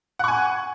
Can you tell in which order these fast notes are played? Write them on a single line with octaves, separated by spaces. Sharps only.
F#5 C#6 G#5